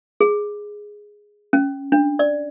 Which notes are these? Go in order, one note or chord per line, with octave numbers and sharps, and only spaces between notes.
G#4
C#4
D4
D5